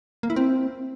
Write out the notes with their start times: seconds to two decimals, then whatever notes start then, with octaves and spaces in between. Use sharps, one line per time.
0.23 A#3
0.30 E4
0.36 C4